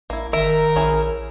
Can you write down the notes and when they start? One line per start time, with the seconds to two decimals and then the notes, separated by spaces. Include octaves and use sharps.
0.10 A1 A#3 E4
0.33 G1 D#3 A#4 E5
0.76 A#1 C#4 E4 G#4